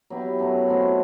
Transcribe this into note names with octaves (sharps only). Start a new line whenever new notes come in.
F#3 B3 E4 G4
F#2 F#3 A3
A2 F#3 C4 D#4